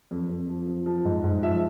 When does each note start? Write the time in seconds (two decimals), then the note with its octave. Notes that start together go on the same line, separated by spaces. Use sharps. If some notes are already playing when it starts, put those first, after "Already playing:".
0.11 F2
0.29 F2
0.49 F3
0.67 F3
0.86 F3
1.05 G#2
1.24 G#2
1.43 F3 E5